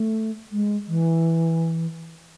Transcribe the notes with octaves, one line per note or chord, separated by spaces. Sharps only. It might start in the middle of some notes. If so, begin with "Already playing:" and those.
Already playing: A3
G#3
E3